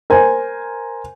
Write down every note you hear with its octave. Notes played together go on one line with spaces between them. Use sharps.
A#4 C5 G#5